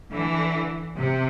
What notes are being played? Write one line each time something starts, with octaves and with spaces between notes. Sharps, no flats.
D3 E3
C3